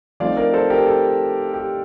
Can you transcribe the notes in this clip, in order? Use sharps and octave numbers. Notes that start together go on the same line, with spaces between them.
F3 A3 C4 D#4 D5 F5
A#4 D5
A4 C5
G4 A#4
A4
G4